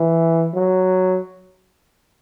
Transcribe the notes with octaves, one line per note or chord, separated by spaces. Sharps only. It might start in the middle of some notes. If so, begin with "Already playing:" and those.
Already playing: E3
F#3